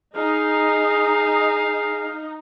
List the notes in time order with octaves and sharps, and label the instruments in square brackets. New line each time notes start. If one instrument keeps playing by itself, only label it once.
[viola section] D#4 [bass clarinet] G#4 [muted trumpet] F5